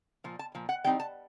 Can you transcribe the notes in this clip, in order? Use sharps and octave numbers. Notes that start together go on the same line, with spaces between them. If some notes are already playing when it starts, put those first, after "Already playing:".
A#2 F3
A5
A#2 F3
F#5
E3 G3 C4 D#4 G5
A5